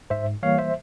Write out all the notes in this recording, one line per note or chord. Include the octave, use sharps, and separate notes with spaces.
G#2 C5 E5
E3 G3 A#3 C#5 F5
C5 E5